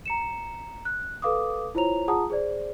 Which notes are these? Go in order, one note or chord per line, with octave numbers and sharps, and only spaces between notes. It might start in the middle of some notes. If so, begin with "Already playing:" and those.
A#5 C#7 E7
F#6
A4 B4 F5 D6 D#6
E4 F4 C5 C#5 A#5 F7
F4 G#4 F#5 A5 A#5 D#6
G#4 C5 D5